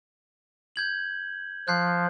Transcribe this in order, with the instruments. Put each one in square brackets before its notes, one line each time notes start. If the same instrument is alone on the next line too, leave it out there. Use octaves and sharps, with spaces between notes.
[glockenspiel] G6 G#6 F#7
[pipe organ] F3 [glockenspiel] F#6 G6 C7